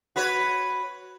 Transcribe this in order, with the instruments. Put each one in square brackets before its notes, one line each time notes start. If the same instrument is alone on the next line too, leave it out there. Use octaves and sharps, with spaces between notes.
[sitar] F#4 B4 C#5